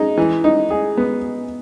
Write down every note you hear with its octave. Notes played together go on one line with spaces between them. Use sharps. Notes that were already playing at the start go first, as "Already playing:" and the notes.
Already playing: G#3 D#4
E3
D#4
G#4
B3